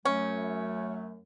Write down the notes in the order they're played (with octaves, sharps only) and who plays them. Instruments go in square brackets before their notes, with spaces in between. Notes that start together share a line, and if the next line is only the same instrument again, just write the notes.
[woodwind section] F#2 F#3 A3 [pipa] C#4